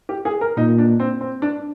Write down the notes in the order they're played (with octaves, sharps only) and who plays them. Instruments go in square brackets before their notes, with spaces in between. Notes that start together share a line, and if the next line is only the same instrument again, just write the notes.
[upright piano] G4
G#4
A#4
[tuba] A#2 [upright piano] D#4
[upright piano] D4
C4
C4
D4